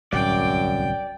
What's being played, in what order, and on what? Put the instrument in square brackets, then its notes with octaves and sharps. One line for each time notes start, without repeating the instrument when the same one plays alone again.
[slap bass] D1 C2 A2 [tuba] F#2 [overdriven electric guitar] D5 [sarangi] G5